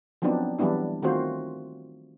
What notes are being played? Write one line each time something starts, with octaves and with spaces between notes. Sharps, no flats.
F3 F#3 B3 C4 D4 D#4
E3 F#3 G3 B3 D4 E4
D#3 A3 C4 F4 F#4 C5